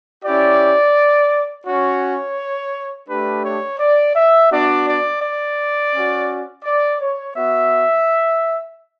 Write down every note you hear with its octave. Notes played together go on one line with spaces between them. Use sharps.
C#4 E4 G4 D5
C#4 F#4 C#5
A3 D4 G4 B4
C#5
D5
E5
B3 D4 F#4 D5
D5
D5
C#4 F#4
D5
C#5
B3 F#4 E5